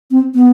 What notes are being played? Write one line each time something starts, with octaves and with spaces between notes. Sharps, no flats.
C4
B3